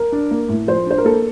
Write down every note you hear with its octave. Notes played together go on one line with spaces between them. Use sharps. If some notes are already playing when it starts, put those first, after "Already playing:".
Already playing: A#4
D4
A#3
A2
F3 C5
D4 C5
A#4
A#3 A4